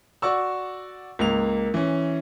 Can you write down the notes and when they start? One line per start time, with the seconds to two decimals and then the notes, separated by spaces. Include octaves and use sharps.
0.22 F#4 D5 C#6 E6
1.19 C#2 A#3 F7
1.74 E3 C#4